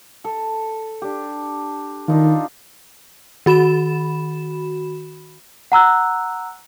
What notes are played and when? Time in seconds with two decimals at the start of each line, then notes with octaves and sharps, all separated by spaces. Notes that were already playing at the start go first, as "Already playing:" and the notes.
0.24 A4
1.02 D4 G4
2.08 D#3 D4 D#4 F4
3.46 D#3 F#4 B5 E7
5.72 F#5 A#5 E6 F#6